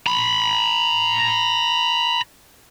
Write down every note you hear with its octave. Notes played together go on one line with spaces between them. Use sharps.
A#5 B5